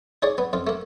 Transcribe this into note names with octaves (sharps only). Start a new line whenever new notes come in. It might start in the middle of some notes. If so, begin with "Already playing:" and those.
D#4 G#4 C#5 D5
B3
F2 F4
A3 A#3